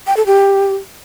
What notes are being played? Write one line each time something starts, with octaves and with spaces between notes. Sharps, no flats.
G5
A4
G4